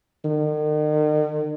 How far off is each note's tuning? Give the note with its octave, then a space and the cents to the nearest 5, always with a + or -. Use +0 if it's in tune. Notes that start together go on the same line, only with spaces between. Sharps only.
D#3 -45